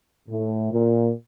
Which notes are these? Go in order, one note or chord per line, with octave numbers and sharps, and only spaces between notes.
A2
A#2